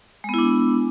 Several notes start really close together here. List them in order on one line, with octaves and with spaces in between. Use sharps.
G#3 B3 E4 D4